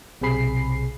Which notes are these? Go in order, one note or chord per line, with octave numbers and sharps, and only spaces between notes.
B1 C3 C4 G#4 B5 C7